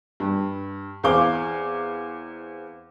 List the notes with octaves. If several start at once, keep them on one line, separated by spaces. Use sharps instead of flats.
G2
E2 C4 F5 D6 G7